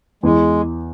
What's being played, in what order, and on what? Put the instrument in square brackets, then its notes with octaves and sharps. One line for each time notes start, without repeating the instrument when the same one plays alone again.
[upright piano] E2 [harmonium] G#3